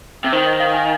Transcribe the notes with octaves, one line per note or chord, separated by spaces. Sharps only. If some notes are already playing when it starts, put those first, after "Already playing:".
C3
D#3 C5
D#5
F5
G#5